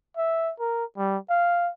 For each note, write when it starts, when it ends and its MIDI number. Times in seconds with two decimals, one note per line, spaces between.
0.17 0.52 76
0.60 0.84 70
0.98 1.17 55
1.30 1.70 77